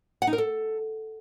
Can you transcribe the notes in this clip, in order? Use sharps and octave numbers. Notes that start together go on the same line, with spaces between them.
F#5
D#4
A#4
A4